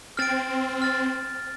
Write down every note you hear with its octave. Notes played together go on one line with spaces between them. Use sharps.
C4 F6 A6 D7
F6 A6